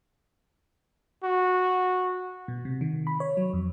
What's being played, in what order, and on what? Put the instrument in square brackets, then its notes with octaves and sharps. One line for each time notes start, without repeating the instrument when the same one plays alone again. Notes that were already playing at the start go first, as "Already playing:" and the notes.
[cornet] F#4
[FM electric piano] B2
C3
D#3
B5
C#5
F#3
F2